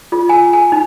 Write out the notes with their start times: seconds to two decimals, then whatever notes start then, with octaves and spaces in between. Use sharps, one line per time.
0.12 F4
0.29 G#5
0.53 G#5
0.72 D#4